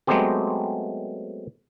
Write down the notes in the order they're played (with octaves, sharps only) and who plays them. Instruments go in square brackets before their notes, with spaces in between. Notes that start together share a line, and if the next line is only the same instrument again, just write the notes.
[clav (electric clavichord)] F#3 G#3 A3 B3 C4 G4